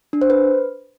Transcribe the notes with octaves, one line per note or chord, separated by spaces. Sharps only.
D4
C5
B4